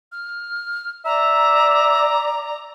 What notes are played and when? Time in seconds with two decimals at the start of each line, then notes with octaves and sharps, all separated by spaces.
0.12 F6
1.05 D5 E5 A#5